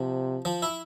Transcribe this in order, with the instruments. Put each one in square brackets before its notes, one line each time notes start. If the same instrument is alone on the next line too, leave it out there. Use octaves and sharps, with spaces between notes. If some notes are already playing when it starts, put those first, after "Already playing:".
Already playing: [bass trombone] C3 [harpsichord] F3
[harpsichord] F3
E4